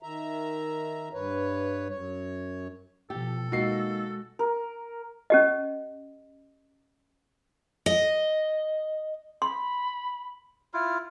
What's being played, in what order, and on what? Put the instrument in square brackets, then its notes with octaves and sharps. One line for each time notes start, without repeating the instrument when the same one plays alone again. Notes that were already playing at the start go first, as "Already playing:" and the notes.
[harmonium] D#3 E5 A#5
G2 B4 C#5
F#2 C#5
[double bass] B2 F3 [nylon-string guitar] G4 [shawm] A4
[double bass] G#3 [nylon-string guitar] A#3 D#4 [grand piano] F#4 C7
[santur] A#4
[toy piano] C#4 G4 D#5
[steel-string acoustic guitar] D#5
[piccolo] B5 [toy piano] C6
[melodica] E4 F4 [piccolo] F6